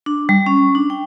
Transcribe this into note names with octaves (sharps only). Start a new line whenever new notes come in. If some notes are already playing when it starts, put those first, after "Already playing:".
D4
G3
C#4
D4
G5